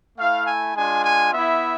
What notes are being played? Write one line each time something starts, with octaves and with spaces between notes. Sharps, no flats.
A3 E4 F5
G#5
G#3 D4 F4 G#5
G#5
B3 E4 E5